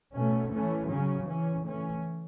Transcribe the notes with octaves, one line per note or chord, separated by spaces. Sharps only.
B2 A3 C#4
E3 A3 C#4
C#3 F#3 C#4
E3 C#4
E3 A3 C#4